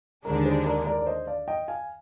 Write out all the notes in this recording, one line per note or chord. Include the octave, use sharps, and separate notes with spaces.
D#2 D3 G#3 D4 A#4
G#4 C5
A#4 D5
A#4 D5
D5
C5 D#5
D5 F5
D#5 G5
F5 G#5